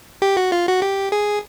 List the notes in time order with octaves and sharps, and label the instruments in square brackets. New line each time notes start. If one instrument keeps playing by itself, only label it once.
[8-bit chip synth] G4
F#4
F4
F#4
G4
G#4